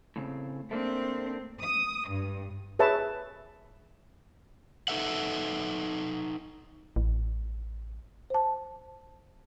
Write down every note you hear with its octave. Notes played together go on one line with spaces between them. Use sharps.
A2 C#3 C4
A3 A#3 C4 D4
D#6
G2
G#4 B4 C#5 E5 A5
D#4 E4 A4 B4 E5 F#5
A1
C5 A5